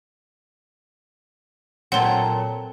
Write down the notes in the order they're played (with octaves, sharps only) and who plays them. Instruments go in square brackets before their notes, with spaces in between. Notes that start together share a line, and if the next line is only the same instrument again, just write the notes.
[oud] A#2 F#3 [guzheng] C4 A4 [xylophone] F#5 C6